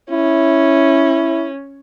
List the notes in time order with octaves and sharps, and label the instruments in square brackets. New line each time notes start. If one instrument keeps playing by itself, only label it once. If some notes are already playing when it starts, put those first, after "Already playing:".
[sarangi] C#4 [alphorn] E4